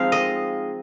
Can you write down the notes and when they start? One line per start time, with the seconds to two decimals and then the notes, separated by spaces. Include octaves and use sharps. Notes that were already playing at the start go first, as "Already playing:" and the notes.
Already playing: F3 G#3 C4 D#4 F5
0.12 D#5